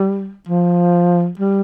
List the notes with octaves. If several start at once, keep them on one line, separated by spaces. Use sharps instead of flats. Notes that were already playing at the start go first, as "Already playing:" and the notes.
Already playing: G3
F3
G3